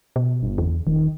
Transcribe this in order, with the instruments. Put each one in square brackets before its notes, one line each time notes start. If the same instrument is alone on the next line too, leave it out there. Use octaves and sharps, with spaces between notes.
[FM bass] B2
[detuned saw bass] G1
[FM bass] E2
[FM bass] E1 [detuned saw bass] D#3